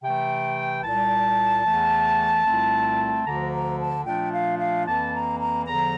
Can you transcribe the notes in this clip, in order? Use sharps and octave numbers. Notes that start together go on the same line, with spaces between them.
C3 E3 A3 G5
C2 A#2 G3 A5
E2 E3 A3
C2 A#2 A3 C4
D2 D3 F3 A#5
A#5
A5
A#2 F3 A3 D4 G5
F5
F5
F2 E3 A#3 A5
A#5
A#5
E2 D3 F3 A#5